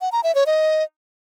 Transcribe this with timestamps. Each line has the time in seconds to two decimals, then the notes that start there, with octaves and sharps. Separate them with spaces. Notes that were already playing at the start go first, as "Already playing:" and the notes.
0.01 F#5
0.12 A#5
0.24 E5
0.35 C#5
0.46 D#5